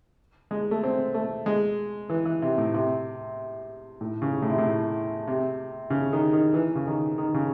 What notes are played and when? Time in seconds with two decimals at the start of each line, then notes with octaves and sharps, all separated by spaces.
0.51 G#3
0.71 A3
0.84 C4
1.14 A3
1.46 G#3
2.09 E3
2.25 E3
2.42 C3
2.58 A2
2.74 C3
4.01 A2
4.22 C#3
4.42 A2
4.50 C3
4.58 A2
5.27 C3
5.90 C#3
6.13 D#3
6.33 D#3
6.54 E3
6.75 C#3
6.87 D#3
7.18 D#3
7.34 C#3